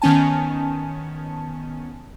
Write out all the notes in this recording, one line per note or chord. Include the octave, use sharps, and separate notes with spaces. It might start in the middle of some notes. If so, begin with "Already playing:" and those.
D#3 B3 C#4 G#5 A5